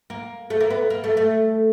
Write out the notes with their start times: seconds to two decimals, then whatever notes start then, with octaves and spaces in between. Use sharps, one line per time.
0.10 A#3
0.50 A3
0.61 A#3
0.70 B3
0.90 A#3
1.04 A3
1.17 A3